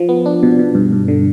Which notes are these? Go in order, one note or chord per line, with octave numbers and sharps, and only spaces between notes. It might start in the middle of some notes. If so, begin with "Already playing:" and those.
Already playing: F3
B3
D4
B2
B2
G2
G2
D3